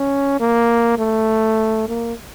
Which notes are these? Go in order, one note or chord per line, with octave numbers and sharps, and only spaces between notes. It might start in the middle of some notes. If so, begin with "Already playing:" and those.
Already playing: C#4
A#3
A3
A#3